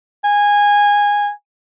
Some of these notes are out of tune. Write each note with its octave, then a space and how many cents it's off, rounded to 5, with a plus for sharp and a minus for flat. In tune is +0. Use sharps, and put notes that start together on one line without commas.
G#5 -15